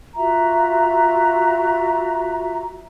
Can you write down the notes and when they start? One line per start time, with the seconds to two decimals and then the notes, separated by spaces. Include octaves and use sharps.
0.15 F4 F#4 E5 A#5